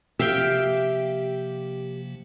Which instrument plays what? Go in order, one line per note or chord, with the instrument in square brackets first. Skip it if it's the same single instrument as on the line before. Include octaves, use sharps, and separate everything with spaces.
[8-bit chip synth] C3 F3 A#3 [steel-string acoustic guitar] G4 [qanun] E5 F5 G5